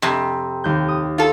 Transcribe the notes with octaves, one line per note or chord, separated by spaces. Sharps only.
F2 C3
D#2 G6
D#6
F4 A4